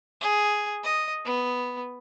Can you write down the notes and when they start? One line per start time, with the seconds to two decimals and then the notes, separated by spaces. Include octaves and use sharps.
0.21 G#4
0.84 D#5
1.25 B3